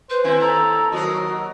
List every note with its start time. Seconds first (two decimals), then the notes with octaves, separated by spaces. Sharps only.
0.10 B4 C5
0.24 D#2 C4 E4 G#5
0.41 A4 A#5
0.92 D#2 F#3 F#4 A#4 D#5